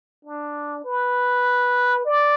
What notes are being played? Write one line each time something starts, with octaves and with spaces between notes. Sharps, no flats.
D4
B4
D5